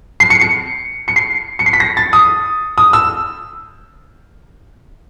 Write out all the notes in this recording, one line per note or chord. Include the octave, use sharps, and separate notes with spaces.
C7
C#7
C#7
C#7
C7
C#7
C7
B6
A#6
A6
D#6
D#6
E6